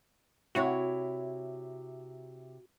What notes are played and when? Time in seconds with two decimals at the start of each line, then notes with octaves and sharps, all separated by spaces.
0.55 C3 E4 F#4 C#5